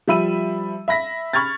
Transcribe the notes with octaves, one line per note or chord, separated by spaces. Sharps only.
F3 G3 E5 B5 E6 D#7
E5 B5 A#6 B6
B5 C#6 F6 G#6 A6